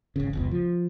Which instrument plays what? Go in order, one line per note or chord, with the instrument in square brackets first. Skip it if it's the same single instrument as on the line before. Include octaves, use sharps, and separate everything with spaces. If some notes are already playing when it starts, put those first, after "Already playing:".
[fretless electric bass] G#1 C#3
F1 C#2 B2
F3